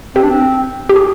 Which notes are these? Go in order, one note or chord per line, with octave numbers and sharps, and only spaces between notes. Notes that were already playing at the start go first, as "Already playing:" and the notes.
C4 G4
D4
C4
G4
G#4